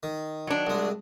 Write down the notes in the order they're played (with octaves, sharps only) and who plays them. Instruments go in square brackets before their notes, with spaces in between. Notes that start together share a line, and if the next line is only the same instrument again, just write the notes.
[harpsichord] D#3
[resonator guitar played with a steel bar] F#3 D4
[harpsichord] C2 G#3